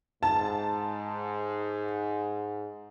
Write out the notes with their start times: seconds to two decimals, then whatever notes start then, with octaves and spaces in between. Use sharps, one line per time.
0.23 G#2 A5